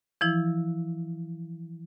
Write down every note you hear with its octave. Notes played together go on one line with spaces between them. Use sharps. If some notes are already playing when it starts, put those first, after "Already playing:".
E3 F3 E4